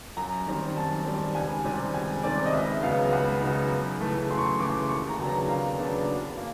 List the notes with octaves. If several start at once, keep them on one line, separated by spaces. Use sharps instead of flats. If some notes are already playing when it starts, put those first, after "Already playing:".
F#2 A#5
D#3 G3 C4
F#2 A5
D#3 G3 C4
C#2 G#5
C3 D#3 G3 C4
C#2 G#5
C3 D#3 G3 C4 D5
D#5
C#2 E5
C#3 F#3 B3 D#4 F5
C#2 F#5
C#3 F#3 B3 D#4
F#2
C#3 E3 A3
F#2 C6
C#6
C6
C#3 E3 A3 D6
D#2 C#6
A#5
C#3 F#3 B3 D4
A#5
D#2 F5
C#3 F#3 B3 D4
E2
A#3